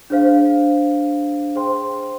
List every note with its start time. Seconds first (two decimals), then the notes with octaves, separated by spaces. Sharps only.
0.10 D4 G#4 C5 F5
1.55 G#4 C5 G5 C6